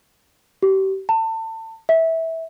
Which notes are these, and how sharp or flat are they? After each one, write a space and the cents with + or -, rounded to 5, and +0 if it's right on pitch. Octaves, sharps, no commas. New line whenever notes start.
G4 -35
A5 +30
E5 -15